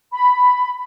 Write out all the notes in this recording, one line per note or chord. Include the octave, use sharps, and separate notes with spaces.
B5